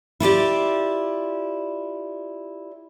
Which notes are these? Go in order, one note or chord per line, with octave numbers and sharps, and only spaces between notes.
E4 F4 G4 D5